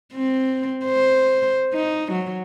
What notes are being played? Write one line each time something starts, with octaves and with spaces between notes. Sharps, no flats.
C4
C5
D#4
F#3